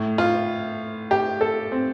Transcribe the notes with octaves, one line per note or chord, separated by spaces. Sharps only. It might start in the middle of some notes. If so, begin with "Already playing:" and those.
Already playing: A2
F4
G4
A4
C4